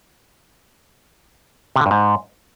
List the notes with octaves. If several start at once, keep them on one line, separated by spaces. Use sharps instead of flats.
C3
D3
G2
G#2